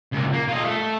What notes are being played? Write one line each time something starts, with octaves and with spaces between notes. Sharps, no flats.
C#2 A#2
A#3
F4 D#5
A3